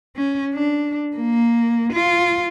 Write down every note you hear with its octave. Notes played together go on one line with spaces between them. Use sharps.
C#4
D4
A#3
F4